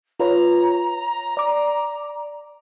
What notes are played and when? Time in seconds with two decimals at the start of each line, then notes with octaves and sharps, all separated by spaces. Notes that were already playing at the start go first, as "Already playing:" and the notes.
0.20 F4 B4 C#5 A#5
1.37 D5 D6